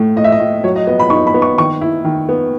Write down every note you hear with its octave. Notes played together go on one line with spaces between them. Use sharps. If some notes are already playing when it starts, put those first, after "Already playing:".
Already playing: A2 A3
A2 D#5
E5
D#5
A2
F#3 C#5
D#5
B3 D#5
B5
D#4 C#6
B5
B3
C#6
D#3 C#6
E4
D#3
B3